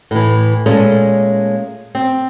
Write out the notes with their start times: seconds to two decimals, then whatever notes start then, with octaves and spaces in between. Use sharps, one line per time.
0.11 A2 E3
0.66 A#2 G#3 A3 C#4 A5
1.95 C4